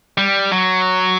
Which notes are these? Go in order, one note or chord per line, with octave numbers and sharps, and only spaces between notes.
G3
F#3